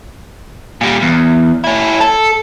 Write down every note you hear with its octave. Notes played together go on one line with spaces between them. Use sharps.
A#2 G3
E2
C#4 E4
A4